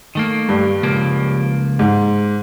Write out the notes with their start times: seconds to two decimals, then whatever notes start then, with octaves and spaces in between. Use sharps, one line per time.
0.15 D#3 A3 A#3
0.49 G2
0.83 C#2 F3 A#3
1.79 G#2